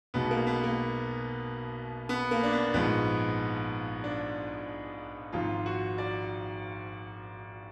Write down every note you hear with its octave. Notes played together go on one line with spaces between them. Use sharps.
B1 B2 G#3 B3
A#3
B3
A#3
B3
A#3
D4
B3
A#1 G#2 F3 G#3 B3
D4
G#1 G#2 F3 F4
F#4
D5